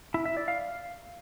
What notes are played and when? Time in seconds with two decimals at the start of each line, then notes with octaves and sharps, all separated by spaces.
0.14 E4
0.26 E5
0.37 D5
0.48 F5